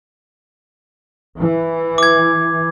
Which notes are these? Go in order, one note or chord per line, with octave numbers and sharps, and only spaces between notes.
E3
D6 G#6